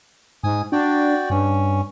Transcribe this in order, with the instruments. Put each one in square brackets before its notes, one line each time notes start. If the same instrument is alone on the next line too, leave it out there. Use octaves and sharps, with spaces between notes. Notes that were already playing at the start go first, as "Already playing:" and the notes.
[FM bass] G#2 [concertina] G#5 D#6
[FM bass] D4 [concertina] F#4 D5 G5
[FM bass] G2 [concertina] C#4